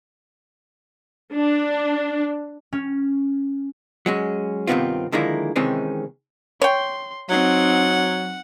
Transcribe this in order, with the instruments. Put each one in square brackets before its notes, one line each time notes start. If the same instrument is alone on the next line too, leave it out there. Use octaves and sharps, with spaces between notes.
[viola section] D4
[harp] C#4
[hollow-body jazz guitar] F#3 G#3 C#4
G2 C3 D#3 B3 C4 F4
D3 D#3 F3 G#3 A#3 E4
C3 D#3 E3 G#3 C4 C#4
[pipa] C#5 G5 [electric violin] C6
[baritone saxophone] F#3 [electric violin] C4 D#4 [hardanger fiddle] F#5